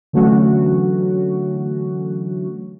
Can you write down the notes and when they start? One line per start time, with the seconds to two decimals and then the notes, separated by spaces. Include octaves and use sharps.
0.13 D3 E3 F#3 A3 C#4 F#4